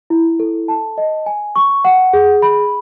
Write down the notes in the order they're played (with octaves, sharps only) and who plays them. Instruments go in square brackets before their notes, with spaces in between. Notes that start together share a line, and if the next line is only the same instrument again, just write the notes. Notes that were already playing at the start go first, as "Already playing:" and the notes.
[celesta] E4
A4
A5
D#5
G#5
C#6
F#5
G#4
B5